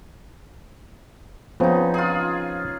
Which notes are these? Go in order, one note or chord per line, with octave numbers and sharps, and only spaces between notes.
C#3 F3 B3 C4 D#4
F4 G#4